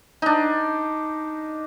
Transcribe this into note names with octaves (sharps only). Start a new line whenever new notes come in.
D4 D#4